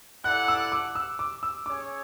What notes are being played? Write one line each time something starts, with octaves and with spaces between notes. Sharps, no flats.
E4 A4 D5 F#5 F#6
E6
D6
E6
D6
E6
C#4 G#4 C#5 D6